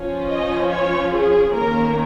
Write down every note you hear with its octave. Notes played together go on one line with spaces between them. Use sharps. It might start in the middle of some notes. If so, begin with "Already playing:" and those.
Already playing: F3 C#4
D#5
C#5
G#4
D#3 A#3 C#4 A#4